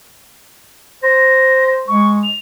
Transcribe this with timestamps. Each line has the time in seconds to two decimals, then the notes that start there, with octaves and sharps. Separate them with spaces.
1.03 C5 A#6
1.88 G#3 C#6
2.24 F7